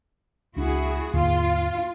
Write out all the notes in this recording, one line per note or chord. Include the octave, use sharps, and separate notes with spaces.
C#2 D4 E4 F#4 G#4
D#2 G#2 D3 F4